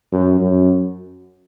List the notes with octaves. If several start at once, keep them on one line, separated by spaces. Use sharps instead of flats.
F#2
F#2